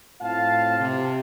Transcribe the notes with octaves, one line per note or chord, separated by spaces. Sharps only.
A2 C4 F4 F5 A5
C3